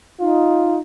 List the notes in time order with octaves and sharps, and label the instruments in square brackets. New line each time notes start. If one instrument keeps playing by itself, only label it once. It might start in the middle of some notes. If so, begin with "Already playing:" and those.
[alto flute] D#4 [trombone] F4